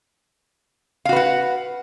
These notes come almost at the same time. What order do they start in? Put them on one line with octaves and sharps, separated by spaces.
F5 F#4 B4 F#5